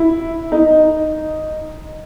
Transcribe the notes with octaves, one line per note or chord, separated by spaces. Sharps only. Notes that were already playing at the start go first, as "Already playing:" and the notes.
Already playing: E4
D#4